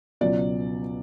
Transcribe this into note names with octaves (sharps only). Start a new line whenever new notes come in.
C#2 B2 F#3 D5